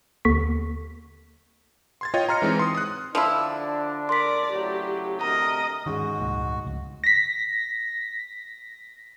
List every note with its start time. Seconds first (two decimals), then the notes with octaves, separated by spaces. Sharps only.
0.25 D#2 D3 C#6 B6
2.01 C6 G#6 A6
2.14 F4 C#5 D#5 G5
2.29 A#5 C6 F6 A#6 C#7
2.42 E3 G#3 C4 D#4
2.59 C6 D#6
2.75 D#6 F#6
3.15 D3 F3 D4 E4
4.09 A#4 D5 C6 B6
4.52 A2 C#3 F#3 G4
5.21 D2 C3 A#4 D#5 A#5
5.86 G#2 D#3 G#3 C#4 F#4
6.19 F1 C#2 A#2
6.64 F1 C#2
7.04 A#6 B6